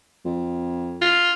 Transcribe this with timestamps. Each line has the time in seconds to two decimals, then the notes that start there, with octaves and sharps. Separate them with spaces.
0.25 F2
1.02 F4